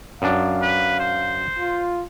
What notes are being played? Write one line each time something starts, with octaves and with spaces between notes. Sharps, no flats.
F#2 D4 F5
B4
C5
F4